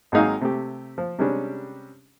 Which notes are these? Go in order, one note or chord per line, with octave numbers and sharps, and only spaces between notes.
G#1 F#3 G#3 D#4 F5 G#5
C3 A3 G4
F3
C3 G3 G#3 C#4 D4